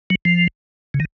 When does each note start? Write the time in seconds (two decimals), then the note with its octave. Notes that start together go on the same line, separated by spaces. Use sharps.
0.10 F#3
0.25 F3
0.94 C#3
1.00 D#3